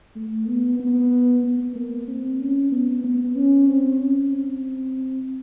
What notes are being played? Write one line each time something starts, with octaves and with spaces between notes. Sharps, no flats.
A3
B3
B3
B3
A#3
C4
C#4
B3
B3
C#4
C4
C#4
C4